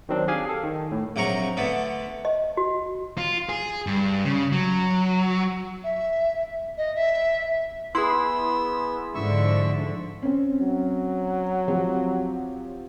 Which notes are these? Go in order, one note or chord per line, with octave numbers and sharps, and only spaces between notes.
D#3 F#3 C4 D4
G4 G#4 F5 G#5
A4
D#3
A2
A#1 C3 F#3 A#5 C#6
D3 A3 B3
D#5
F#4
F4
G#4
G2
C#3
F#3
E5
D#5
E5
B3 E4 G#4 C6 E6
G#2 D3 F3 E5 C#6 E6
C4 C#4
F#3
F3 C4 G4